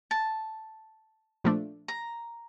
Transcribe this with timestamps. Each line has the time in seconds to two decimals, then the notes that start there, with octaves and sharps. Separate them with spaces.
0.11 A5
1.44 A#2 F3 A3 D4
1.88 A#5